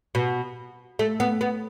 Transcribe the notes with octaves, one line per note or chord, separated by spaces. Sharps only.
B2
A3
B3
B3